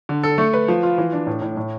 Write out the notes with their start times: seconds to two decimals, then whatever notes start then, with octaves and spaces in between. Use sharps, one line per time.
0.09 D3
0.23 A4
0.38 A3
0.54 B4
0.68 F3
0.83 F4
0.98 E3
1.12 D4
1.27 A2
1.42 A2
1.57 A2